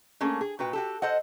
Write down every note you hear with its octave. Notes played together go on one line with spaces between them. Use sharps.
A3 A#3 C#4 G#4
G#4
A#2 F#4 B4 G5
F#4 G4 A4
A4 C5 D#5 F#5